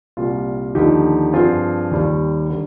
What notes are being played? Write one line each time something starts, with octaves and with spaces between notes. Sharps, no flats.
C2 A#2 G3 F4
D#2 D3 F3 D#4 G4
G2 F3 C4 F4 G#4
D#2 D#3 G3
D3 G3